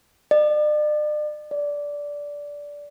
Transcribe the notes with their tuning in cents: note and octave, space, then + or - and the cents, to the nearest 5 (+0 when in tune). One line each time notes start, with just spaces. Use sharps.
D5 +40
D5 -15